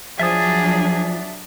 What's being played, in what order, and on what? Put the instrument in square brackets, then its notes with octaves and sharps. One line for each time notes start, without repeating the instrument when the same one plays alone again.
[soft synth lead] F3 [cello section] F#3 D4 [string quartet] G#4 [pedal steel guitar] E5 A5 D#6